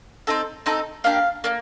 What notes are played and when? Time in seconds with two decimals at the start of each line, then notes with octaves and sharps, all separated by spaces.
0.27 C4 D#4 A4
0.66 C4 D#4 A4
1.04 A#3 D4 G4 F5
1.44 A#3 D4